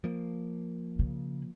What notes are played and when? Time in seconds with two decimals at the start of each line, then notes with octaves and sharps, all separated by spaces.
0.04 F3 A#3
0.99 C#3